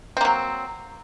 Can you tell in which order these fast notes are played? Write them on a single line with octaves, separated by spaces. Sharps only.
C4 A#3 F#3